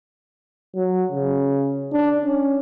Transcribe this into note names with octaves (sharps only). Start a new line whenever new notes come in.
F#3
C#3
D4
C#4